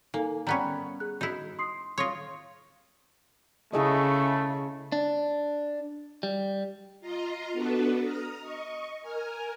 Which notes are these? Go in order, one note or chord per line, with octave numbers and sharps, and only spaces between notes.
A#3 D#4 A4 G#5
G3 B3 C#4 A#5 B5
G#4 F#6
D#4 E4 F#4
C6 D#6 C7
F4 C#5 C6 D#6 A#6
C#3 A3 E4 G#4 D#5
D4
G3
F4 D#5 A#5 C6
B3 D4 F#4 A4 B4
A#5 D#6 F6
D#5 C#6
A#4 G#5 F6